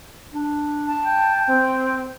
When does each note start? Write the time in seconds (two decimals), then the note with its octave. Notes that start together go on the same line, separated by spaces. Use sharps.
0.34 D4
0.87 A5
1.04 G5
1.48 C4